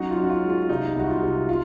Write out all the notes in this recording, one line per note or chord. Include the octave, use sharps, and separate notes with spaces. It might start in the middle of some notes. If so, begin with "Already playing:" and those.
Already playing: F#3 C#4 D#4 F#4
F4
C#4
F#4
F4
G#3
F4
C3 D#4
C2 F#4
F4
C3
F4